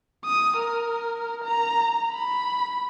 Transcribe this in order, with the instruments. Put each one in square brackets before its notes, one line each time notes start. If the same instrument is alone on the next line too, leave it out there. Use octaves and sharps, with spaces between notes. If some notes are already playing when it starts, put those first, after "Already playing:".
[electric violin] D#6
A#4
A#5
B5